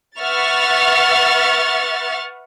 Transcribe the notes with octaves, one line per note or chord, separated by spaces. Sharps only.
B4 E5 F#5 C#6 F6 A6